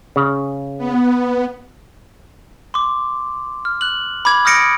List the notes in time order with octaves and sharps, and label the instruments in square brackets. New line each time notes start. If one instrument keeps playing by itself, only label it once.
[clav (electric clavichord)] C#3
[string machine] B3
[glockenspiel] C6 D6
F6
F#6 F#7
B5 D6 G#6
D#6 F6 G6 A#6 C#7 D7